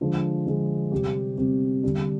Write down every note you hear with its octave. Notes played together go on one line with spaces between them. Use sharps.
D3 F3 G#3
D3 F3 G#3
C3 G3 C4 G4
C3 G3 C4 G4
D3 G3 D4